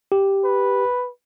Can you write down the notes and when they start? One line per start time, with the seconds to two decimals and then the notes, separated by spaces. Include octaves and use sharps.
0.12 G4
0.44 B4